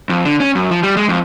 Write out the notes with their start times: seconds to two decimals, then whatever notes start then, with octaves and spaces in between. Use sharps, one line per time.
0.10 F2
0.25 D3
0.40 C#4
0.55 F#2
0.71 F3
0.83 G3
0.97 G#3
1.09 F2